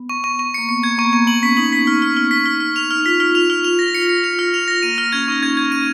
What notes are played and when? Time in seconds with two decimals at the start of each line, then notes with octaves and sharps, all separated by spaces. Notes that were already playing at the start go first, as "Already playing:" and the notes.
Already playing: B3
0.09 C#6
0.24 C#6
0.39 C#6
0.54 A#3 C#7
0.69 B3 C#7
0.83 G#6
0.98 A#3 C#6
1.05 B3
1.13 A#3 C#6
1.27 B3 F#7
1.42 C#4 B6
1.57 D#4 F#7
1.72 D#4 B6
1.87 F6
2.02 F6
2.17 F6
2.31 B6
2.46 F6
2.60 F6
2.76 F7
2.91 F6
2.97 D#4
3.05 F4 B6
3.20 F6
3.35 F4 F7
3.50 F6
3.64 F4 F7
3.79 A#6
3.95 C#7
4.09 C#7
4.24 F7
4.39 F6
4.54 F7
4.68 A#6
4.82 A#3 D#7
4.98 F6
5.12 C#4 G#6
5.27 D#4 C#6
5.42 C#4 G#6
5.57 G#6
5.72 D#7